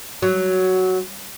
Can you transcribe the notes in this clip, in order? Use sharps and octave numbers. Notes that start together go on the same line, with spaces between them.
F#3